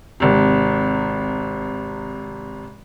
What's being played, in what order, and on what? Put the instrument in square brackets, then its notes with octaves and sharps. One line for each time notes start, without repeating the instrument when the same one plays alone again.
[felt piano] G#1 C3